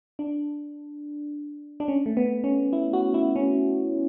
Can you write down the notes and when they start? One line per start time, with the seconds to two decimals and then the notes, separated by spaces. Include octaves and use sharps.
0.19 D4
1.80 D4
1.88 C#4
2.06 A3
2.17 B3
2.44 C#4
2.73 E4
2.93 F#4
3.14 E4
3.36 C#4